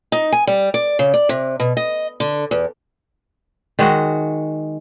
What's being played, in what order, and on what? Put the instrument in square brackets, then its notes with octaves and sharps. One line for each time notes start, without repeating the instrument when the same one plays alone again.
[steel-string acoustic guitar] D#4
G#5
G3
D5
C#3
D5
C3
B2
D#5
D3
E2
[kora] D#3 G#3 F#4